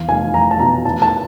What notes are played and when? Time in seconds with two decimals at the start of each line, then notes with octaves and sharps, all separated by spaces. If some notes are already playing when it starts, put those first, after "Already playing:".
Already playing: E2 F5
0.09 F1 G#5
0.34 F1 A#5
0.51 A5
0.59 B2 A#5
0.85 E2 A5
1.02 A5